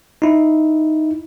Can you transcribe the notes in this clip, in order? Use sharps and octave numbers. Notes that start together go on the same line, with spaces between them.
D#4 E4